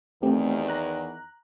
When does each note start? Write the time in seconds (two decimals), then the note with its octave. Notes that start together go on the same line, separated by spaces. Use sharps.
0.23 E2 D#3 A3 C4 G4
0.69 A#5 F#6